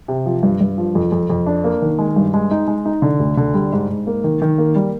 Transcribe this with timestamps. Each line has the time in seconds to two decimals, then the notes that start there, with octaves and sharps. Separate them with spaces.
0.08 C3
0.26 F3
0.43 G2
0.61 G2
0.78 F3
0.95 F2
1.12 F2
1.30 F2
1.46 D4
1.64 A#3
1.82 D#3
1.99 G#3
2.16 G2
2.34 G#3
2.51 D#4
2.68 G#3
2.85 D#4
3.02 D3
3.19 D2
3.37 D3
3.54 G3
3.72 G#2
3.89 G#2
4.07 A#3
4.24 D#3
4.42 D#3
4.58 A#3
4.75 G3